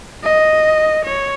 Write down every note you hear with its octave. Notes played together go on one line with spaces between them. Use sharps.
D#5
C#5